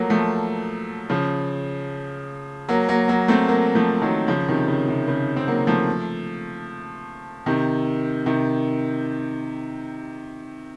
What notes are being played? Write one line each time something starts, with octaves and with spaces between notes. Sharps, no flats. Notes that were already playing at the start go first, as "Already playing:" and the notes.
Already playing: F3 F#3 A3 A#3
F3 A3
C#3 F3
F#3 A#3
F#3 A#3
F#3 A#3
A3 C4
F#3 A#3
F3 A3
D#3 F#3
C#3 F3
C3 D#3
C#3
C3
C#3
C4
F#3 A#3
F3 A3
C3 D#3
C3 D#3